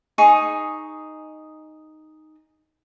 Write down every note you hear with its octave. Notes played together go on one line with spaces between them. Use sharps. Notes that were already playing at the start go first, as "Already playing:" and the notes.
D#4 G#4 C#6